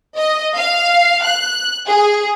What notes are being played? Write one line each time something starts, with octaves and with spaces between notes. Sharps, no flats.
D#5
F5
F#6
G#4